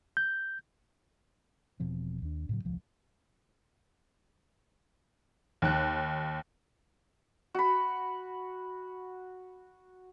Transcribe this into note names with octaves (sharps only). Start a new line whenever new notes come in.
G6
E1 B2 F3 C4
D#2 D4
A2 C#3 F#3
E1 C#2 A2 F3
D#2 F#6
F#4 B5